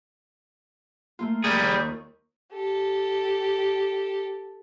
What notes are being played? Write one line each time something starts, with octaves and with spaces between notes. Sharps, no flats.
A3 A#3 F4
G3 G#4 A#4 C#6
D#2 D#4
G4 A4